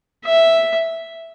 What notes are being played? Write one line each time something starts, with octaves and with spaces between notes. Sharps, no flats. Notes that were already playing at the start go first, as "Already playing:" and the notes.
E5